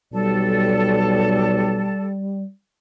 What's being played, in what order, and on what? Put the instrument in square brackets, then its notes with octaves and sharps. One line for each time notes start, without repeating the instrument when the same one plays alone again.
[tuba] B1 [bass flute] G3 [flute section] A4 D5 A5